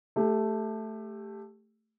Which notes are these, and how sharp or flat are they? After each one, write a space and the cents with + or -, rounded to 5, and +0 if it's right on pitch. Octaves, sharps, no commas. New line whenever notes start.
A3 +0 G4 +20